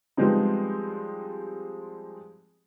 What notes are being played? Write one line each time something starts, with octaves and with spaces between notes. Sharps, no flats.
F3 G3 G#3 B3 C4 D#4